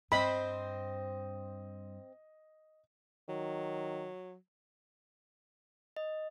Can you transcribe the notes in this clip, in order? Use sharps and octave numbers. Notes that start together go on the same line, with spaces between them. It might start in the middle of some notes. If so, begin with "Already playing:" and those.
G2 C4 C5 D#5 B5
D#3 F#3
D#5